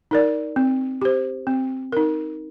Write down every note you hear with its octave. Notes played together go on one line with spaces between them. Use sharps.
D#4 A#4 D5
C4
G4 C5
C4
D#4 A#4